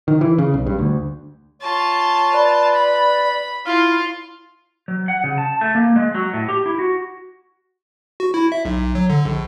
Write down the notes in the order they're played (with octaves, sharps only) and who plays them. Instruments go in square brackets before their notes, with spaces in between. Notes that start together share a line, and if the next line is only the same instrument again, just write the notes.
[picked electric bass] D#3
E3
C#3
B1
G2
D2
[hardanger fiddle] F4 A5 [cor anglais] C#5
[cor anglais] B4 [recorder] D5
[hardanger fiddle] B5
[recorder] E4 [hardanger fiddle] F4 [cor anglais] F5
[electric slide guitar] F#3
F#5
C#3
A5
A3
A#3
G#3
F#3
A2
G4
E4
F#4
[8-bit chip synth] F#4
E4
E5
B1
F#3
D3
A#1